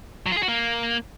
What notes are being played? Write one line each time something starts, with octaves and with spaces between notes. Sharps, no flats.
F#3
F4
G#4
F#4
A#3